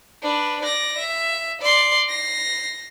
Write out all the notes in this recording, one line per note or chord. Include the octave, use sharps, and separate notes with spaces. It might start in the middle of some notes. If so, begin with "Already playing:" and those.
D4 B4
D5 A#6
E5
D5 C6
A#6 C7